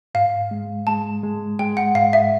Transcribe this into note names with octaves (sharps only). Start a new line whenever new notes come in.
G#2 F5
G#3
G#3 A5
G#3
G#3 G5
F#5
G#2 F5
E5